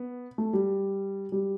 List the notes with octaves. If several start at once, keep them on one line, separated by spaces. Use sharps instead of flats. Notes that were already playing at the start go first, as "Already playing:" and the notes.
Already playing: B3
A3
G3
G3